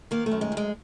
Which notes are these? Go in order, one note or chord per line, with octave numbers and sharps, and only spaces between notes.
D#3 A#3
A3
F#2
G#3
F#2
G#3